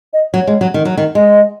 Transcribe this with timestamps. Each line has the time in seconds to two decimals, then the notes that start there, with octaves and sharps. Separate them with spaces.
0.13 D#5
0.34 F#3 C#5
0.47 G#3
0.61 F#3
0.74 D#3
0.85 F#3
0.97 D#3
1.15 G#3 D#5